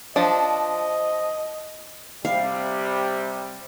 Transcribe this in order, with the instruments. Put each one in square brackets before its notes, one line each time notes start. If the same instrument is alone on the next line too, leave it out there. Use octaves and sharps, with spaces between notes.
[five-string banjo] F3 D4 [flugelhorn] D#5
[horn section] C3 G3 [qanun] F5